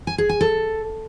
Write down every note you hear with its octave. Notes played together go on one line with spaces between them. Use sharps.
G#5
G#4
G#5
A4